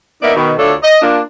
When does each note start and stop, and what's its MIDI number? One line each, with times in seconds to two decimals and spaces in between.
0.23 0.34 58
0.23 0.34 59
0.23 0.34 63
0.23 0.34 74
0.23 0.34 76
0.35 0.54 47
0.35 0.54 51
0.59 0.74 38
0.59 0.74 57
0.59 0.74 62
0.59 0.74 65
0.59 0.74 69
0.59 0.74 73
0.83 1.02 75
1.02 1.21 58
1.02 1.21 62
1.02 1.21 65